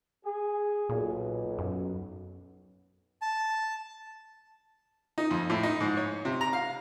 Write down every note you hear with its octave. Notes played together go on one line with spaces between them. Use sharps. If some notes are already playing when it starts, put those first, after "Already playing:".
G#4
B1 A#2
F#2
A5
D#4
F2
A2
D#4
G#2
C#5
C3
A#5
F5